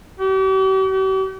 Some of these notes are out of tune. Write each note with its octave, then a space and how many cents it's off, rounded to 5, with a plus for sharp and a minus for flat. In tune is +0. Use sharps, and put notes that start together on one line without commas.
G4 -45
G4 -45